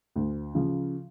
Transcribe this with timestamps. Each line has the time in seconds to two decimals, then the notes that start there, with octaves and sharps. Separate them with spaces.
0.16 D2
0.55 C#3 F3